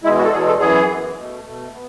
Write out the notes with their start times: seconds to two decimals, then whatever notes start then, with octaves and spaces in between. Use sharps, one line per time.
0.04 E2 B2 G#3 E4
0.18 F#4
0.25 A4
0.32 E2 B2 G#3 G#4
0.47 A4
0.60 F#2 E3 B3 G#4
0.88 F#2 E3 B3
1.17 B2 A3
1.45 B2 A3
1.73 B3